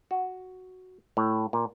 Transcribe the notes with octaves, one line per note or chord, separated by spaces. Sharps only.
F#4
A2
A#2